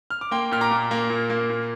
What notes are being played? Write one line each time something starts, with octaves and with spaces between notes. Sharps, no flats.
F6
D6
A#3 G5 C6
A#2 F6
A#5 D6
A#2
A#3
A#2
A#3
A#2